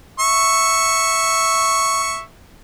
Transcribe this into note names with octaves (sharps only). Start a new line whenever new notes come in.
E5 C#6